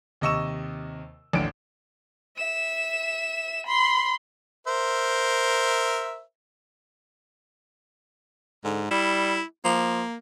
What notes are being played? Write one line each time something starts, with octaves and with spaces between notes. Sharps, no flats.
D#2 C3 D#5 C#6 E6 E7
A1 D#2 D3 D7
E5 E7
B5 C6
A#4 C5 E5
G#2 D3
G3 E4
F3 A#3